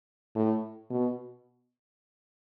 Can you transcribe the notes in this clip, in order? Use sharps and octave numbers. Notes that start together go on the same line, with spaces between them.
A2
B2